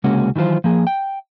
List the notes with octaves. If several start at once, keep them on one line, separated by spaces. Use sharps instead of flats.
C2 C#3 G#3 A#3 C#4 F#4
D#3 E3 F#3 F4 C5
F3 A#3 G#4
G5